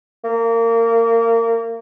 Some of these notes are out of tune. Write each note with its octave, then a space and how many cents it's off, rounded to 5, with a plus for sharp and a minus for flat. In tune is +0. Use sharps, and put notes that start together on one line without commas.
A#3 -25